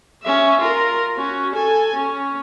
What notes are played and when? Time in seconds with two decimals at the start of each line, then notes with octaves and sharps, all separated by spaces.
0.23 C#4 E5
0.60 F4 A#4
1.15 C#4 F#4
1.53 A4 G#5
1.95 C#4